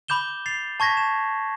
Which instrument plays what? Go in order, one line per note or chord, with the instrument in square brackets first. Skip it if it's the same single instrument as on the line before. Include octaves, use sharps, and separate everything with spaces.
[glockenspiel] B5 D6 G6 E7 G7
A6 C7 F7
A5 C#6 G#6 A#6 B6
E7